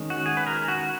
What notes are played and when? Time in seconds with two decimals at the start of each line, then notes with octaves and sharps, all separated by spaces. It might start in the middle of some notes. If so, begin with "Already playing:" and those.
Already playing: D#3 G#3 C#4
0.10 F#4
0.26 G#4
0.37 B4
0.47 A#4
0.68 F#4